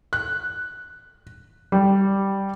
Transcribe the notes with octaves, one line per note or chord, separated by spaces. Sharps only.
F#6
G3